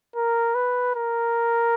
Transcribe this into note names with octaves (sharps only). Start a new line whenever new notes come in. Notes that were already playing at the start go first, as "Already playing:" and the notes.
A#4
B4
A#4